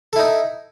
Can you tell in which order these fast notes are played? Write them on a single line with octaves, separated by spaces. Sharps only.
A4 E4 D#4